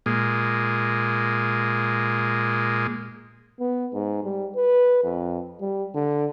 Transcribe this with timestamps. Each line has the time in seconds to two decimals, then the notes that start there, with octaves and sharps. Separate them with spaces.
0.06 A#2 G#3
3.60 B3
3.94 G#2
4.24 G3
4.56 B4
5.04 F2
5.61 G3
5.94 D3